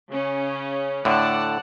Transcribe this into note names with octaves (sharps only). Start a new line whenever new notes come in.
C#3 C#4
A2 D3 D5 F#5 A5